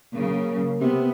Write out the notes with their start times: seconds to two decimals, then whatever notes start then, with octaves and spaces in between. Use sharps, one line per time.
0.14 C#3 F#3 A#3
0.81 C3 B3